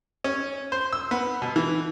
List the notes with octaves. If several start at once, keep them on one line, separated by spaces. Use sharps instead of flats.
C#4
C5
E6
B3
B2
E3